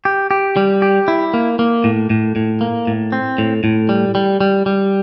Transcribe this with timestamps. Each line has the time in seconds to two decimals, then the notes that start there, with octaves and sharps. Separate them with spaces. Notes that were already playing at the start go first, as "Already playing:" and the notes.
0.05 G4
0.31 G4
0.57 G3
0.82 G4
1.08 E4
1.34 A#3
1.59 A#3
1.84 A2
2.10 A2
2.36 A2
2.61 A#3
2.87 A2
3.12 C4
3.38 A2
3.64 A2
3.89 G3
4.15 G3
4.41 G3
4.66 G3